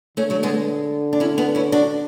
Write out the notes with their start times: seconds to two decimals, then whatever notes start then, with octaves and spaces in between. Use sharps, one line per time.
0.17 D3 A3 C#4
0.30 F#3 A3
0.43 G#3 B3
1.13 D4
1.20 C#4 E4
1.38 B3 D4
1.55 C#4 E4
1.72 D4 F#4